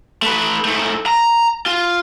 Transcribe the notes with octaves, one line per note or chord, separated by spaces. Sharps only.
A3 B4
G#2 A3
A#5
F4